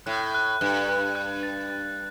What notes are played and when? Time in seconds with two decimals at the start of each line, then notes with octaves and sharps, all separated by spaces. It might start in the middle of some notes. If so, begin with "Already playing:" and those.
0.06 A2 F#6
0.34 F#6
0.61 G2 F#6
0.89 F#6
1.15 F#6
1.43 A6
1.70 A6